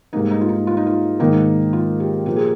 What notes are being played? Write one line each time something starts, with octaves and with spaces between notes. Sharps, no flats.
G#2 G3 A#3 D#4
D#4
F4
D#4
F4
D#4
F4
G#2 D#3 A#3 D#4
F4
G4
A#2 F3 A#3 G4
G#4